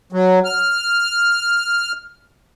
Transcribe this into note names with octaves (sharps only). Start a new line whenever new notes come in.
F#3
F6